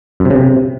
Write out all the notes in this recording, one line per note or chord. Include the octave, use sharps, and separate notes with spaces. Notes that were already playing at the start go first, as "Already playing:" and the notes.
F#2
C3
C#3
C3